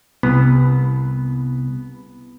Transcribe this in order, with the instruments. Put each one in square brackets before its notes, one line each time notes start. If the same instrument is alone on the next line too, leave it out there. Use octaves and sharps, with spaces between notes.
[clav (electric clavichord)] C2 [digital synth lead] B3